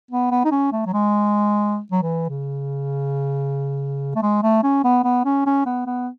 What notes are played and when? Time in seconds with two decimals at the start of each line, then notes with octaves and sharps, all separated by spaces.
0.11 B3
0.31 B3
0.45 D#4
0.51 C#4
0.72 A3
0.86 F#3
0.93 G#3
1.92 F#3
2.02 E3
2.29 C#3
4.15 A3
4.22 G#3
4.43 A3
4.63 C#4
4.84 B3
5.04 B3
5.25 C#4
5.46 C#4
5.66 B3
5.86 B3